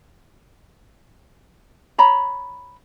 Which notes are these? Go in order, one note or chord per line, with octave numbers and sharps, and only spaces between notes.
C#5 A#5 B5